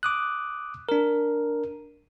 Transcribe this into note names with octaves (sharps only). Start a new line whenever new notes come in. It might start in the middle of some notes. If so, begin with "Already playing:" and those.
D6 D#6 F#6
D4 A#4